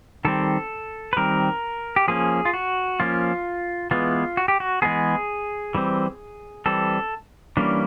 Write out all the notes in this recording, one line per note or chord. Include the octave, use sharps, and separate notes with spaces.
D#3 G3 C4 A4
B4
D#3 G3 C4 A#4
G4
F3 A#3 C#4 G#4
F4
F#4
F3 A#3 C#4 F4
E3 G#3 B3 F4
F#4
G4
F#4
E3 G#3 B3 G#4
E3 G3 C4
E3 G3 C4 A4
E3 G3 A#3 C#4 D4